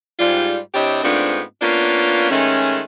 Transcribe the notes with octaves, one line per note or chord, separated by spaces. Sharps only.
G#2 G3 F4
C3 D4 E4 G4 C#5 D#5
G#2 A3 B3 C4 D4 F4
A#3 B3 C#4 D4 F4
D#3 G#3 A3 C#4